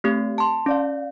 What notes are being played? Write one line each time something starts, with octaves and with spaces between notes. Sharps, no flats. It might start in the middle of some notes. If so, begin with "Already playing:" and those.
A3 C4 G4
A5 C6
C#4 D5 F5